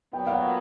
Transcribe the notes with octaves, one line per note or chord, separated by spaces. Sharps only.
A#2 F#3 B3 G5
F5
F#5